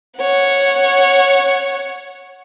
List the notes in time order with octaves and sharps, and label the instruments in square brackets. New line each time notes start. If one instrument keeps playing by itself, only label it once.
[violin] C#5 F#5